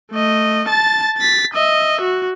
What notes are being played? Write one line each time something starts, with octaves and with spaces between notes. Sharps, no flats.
A3 D#5
A5 A6
A6 B6
D#5 E5
F#4